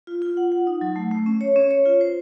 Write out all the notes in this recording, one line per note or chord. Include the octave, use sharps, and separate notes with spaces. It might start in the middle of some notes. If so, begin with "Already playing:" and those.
F4
F4
F#5
F#5
D#4
F#3
A3
A3
C#4
C#5
C#4
C#5
F4
C5